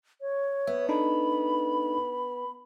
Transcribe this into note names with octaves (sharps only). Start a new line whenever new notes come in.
C#5
B3 E5
D4 D#4 A4 B5